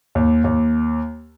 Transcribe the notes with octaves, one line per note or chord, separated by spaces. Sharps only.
D#2
D#2